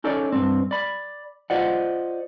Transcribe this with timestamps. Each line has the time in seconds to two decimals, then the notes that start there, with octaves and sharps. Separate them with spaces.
0.04 C#4 D#4 A4 C#5 D5
0.32 G2 C4
0.71 D5 B5
1.50 F4 C5 D5 D#5 F#5